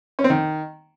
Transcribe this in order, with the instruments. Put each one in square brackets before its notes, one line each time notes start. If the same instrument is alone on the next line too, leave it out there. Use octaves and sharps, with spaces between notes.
[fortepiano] C#4
C4
D#3